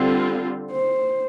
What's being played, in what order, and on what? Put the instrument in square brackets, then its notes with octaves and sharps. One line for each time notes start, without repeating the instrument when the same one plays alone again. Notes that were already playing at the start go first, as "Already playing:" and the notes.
Already playing: [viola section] D3 G3 C4 F4
[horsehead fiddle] C5